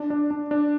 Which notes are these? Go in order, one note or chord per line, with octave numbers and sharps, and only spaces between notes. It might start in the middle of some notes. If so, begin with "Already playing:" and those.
Already playing: D4
D4
D4
D4